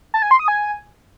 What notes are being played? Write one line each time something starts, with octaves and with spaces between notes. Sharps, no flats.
A5
G#5
C6
D#6
G#5